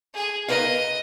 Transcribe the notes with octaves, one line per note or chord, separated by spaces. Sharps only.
G#4
A#4 B4 D#5 F5